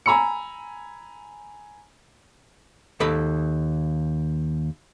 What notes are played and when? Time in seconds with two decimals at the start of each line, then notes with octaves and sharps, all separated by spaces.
0.06 G#5 A#5 B5 E6 C#7
3.00 D#2 A4 B5